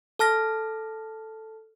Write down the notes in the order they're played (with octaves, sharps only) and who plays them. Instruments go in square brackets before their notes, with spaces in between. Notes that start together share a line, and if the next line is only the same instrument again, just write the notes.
[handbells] A4 A5 F6 A#6